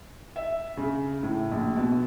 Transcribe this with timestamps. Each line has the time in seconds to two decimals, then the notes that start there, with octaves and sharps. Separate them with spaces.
0.36 E5
0.77 C#3
1.23 A2
1.51 A#1
1.76 B2